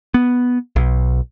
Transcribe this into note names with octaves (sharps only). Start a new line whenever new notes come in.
B3
B1